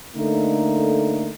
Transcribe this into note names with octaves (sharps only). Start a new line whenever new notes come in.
D3 A3 A#3 D#4